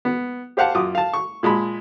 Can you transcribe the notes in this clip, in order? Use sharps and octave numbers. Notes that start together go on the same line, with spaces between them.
B3
G4 C5 F5 F#5 A5
F#2 F4 D6 D#6
F5 A5
C#6
A#2 G#3 A5 B5